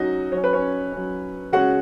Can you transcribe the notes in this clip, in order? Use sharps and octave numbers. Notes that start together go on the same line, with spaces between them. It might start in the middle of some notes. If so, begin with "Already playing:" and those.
Already playing: F#3 C#4 D#4 F#4 D#5
F#3 C#4 C#5
B4
C#4 C#5
F#3 C#4
C#3 G#3 C#4 F#4 F#5